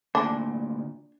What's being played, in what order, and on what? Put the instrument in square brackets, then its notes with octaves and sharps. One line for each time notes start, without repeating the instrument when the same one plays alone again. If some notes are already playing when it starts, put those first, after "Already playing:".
[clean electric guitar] D2 A#2 [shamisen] D4